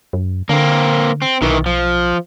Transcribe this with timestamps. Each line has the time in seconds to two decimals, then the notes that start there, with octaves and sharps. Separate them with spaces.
0.13 F#2
0.49 D3 A#3 C4
1.22 C4
1.42 B1 D#3 E3
1.66 F3